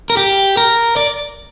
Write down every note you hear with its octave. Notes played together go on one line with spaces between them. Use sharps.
A#4
G4
A#4
D5